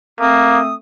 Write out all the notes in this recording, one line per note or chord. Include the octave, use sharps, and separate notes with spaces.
A3 A#3 C4 D#6